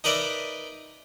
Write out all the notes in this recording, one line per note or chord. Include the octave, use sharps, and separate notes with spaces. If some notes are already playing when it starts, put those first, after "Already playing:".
D#4 A#4 B4 D5 E5